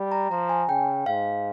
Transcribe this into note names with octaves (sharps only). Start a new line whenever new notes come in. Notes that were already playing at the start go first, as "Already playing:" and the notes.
Already playing: G3
A#5
F3 A#5
G#5
C#3 G5
G#2 F5